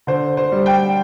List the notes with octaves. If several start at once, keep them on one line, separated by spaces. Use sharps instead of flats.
D3 C5
C5
G3
G5